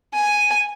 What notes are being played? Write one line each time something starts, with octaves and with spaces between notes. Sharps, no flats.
G#5